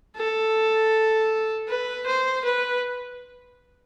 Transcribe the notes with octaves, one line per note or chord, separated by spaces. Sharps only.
A4
B4
C5
B4